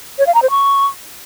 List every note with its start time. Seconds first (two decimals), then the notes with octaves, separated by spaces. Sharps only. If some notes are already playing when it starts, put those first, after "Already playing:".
0.19 C#5
0.27 F5
0.35 A#5
0.42 C5
0.50 C#6